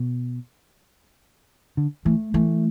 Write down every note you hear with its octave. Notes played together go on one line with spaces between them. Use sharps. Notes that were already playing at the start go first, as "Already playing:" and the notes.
Already playing: B2
D3
E3 A3
E3 A3